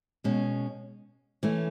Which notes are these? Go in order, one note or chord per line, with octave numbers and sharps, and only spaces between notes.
B2 G#3 C#4
E3 A3 C#4